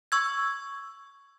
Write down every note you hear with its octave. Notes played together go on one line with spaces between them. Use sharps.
C#6 E6 G#6